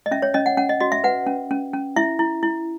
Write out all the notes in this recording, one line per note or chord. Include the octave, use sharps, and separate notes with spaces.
D#5
C#4 E5
C#5
C#4 D#5
F#5
C#4 F#5
D#5
F#4 D#5
E5
B4 F#5
C#4
C#4
C#4
E4 E5
E4
E4